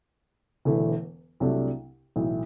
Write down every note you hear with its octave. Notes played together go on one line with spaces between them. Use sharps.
E1 E2 D3 A3 E4
C2 C3 F#3 A3 D4
B1 A2 E3